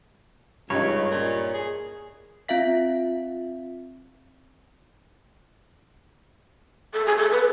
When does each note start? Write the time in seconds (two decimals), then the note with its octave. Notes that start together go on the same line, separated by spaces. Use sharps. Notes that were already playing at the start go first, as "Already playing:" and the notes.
0.70 C#2 G2 D#4 C#5
1.11 A#2
1.54 G#4
2.49 C4 F4 E5 F5 B6
6.94 A4
7.06 G#4
7.18 A4
7.31 B4